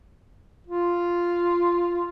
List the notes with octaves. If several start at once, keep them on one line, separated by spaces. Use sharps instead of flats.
F4